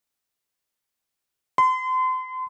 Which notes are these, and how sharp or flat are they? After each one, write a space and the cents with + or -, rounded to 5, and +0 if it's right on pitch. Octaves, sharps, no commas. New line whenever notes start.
C6 -35